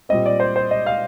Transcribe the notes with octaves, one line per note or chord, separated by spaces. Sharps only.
A#2 G3 C4 D#5
D5
C5
C5
D#5
F5